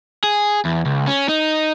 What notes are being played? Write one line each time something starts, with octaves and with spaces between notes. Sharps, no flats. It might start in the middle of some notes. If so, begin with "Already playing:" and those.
G#4
E2
C#2
C#4
D#4